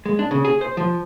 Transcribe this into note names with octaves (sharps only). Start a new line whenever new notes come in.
G#3
D4
C#3
G#4
C5
F3